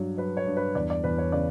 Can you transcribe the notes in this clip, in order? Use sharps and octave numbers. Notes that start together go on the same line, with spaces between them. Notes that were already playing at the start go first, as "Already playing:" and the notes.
Already playing: G2 F#3 C#5
F#3 B4
C#5
G2
B4
E2 D5
D5
E2 B4
C#5
C#3 D5